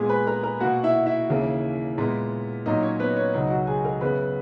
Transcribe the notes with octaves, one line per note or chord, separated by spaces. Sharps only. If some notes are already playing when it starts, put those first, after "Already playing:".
Already playing: A#2 G#3 B3 G#4 G#5
B4 B5
A#4 A#5
A#4 A#5
B2 A#3 F#4 F#5
E4 E5
E4 E5
D#2 C#3 E3 A#3
A#2 G#3 B3
A#2 F#3 A#3 D#4 D#5
C#4 C#5
B3 B4
C#4 C#5
C#2 B2 F#3 D#4 D#5
F#4 F#5
G#4 G#5
A#4 A#5
F#2 C#3 F#3 B3 B4 B5